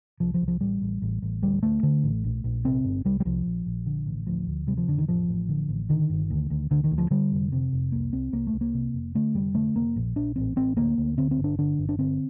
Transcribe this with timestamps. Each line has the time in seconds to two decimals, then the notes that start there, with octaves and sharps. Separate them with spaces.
0.20 C2 F3
0.34 F3
0.41 C2
0.48 F3
0.61 A1 G3
0.82 A1
1.02 A1
1.22 A1
1.42 D2 G3
1.63 D2 A3
1.83 D3
2.04 A1
2.24 A#1
2.44 A#1
2.64 C3 C4
2.84 G1
3.05 C2 G3
3.20 G3
3.25 C2 F3
3.46 A#1
3.66 A#1
3.86 D3
4.07 A1
4.27 D2 F3
4.47 D2
4.67 C3 G3
4.77 F3
4.88 F1 D3
4.98 D#3
5.08 A1 F3
5.29 A1
5.49 D3
5.69 A1
5.89 D3 D#3
6.10 G1
6.30 D2
6.50 D2
6.71 D2 D3
6.84 D#3
6.91 D2
6.98 F3
7.11 D3 G3
7.32 F1
7.52 C3
7.73 F1
7.92 C2 A#3
8.13 C2 C4
8.33 C2 A#3
8.47 A3
8.53 C2
8.61 A#3
8.74 C3
8.94 F1
9.15 D3 A3
9.35 F1 G3
9.55 D3 A3
9.75 F1 A#3
9.96 A#1
10.16 A#1 D4
10.36 A1 C4
10.56 A1 C4
10.76 D2 A#3
10.98 D2
11.18 D3 C4
11.31 C4
11.39 G1
11.44 D4
11.58 D3 D4
11.79 G1
11.89 D4
11.98 D3 C4